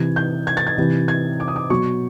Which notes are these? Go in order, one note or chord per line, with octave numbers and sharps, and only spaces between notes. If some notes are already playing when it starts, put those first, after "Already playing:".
Already playing: C3 E3 G#6
G6
G#6
A6
G#6
C3 E3
G#6
D6
D#6
D6
B2 F#3 C#6